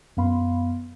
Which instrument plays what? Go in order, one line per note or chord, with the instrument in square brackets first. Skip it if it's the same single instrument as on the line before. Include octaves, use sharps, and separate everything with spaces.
[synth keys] F#2 B3 F5 B5 C6